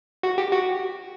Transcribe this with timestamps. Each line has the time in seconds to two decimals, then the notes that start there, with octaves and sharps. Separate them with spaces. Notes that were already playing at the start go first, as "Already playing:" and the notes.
0.23 F#4
0.38 G4
0.52 F#4